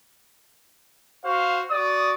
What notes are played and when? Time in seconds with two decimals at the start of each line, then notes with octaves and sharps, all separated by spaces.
1.24 F#4 C5 F5
1.70 F#4 D5 D#6